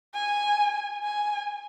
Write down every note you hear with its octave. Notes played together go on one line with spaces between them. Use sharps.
G#5
G#5